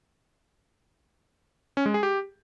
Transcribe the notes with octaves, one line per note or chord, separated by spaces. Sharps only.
C#4
G#3
G#4
G4